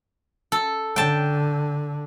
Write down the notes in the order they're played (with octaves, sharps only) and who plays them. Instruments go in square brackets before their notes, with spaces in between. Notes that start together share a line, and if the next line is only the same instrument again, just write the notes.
[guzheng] A4
[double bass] D3 [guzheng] G5 A5